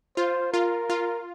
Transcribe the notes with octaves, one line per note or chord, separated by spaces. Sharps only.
F4 C5
F4 A#4
F4